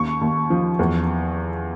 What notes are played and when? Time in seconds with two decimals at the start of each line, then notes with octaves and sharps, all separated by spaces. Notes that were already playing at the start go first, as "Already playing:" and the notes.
Already playing: D#2 C#6
0.21 D#2
0.50 F3
0.79 E2